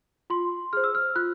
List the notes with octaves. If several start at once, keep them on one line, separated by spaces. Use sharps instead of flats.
F4 C6
G#4 C5 F6
E6
F6
F4 F#6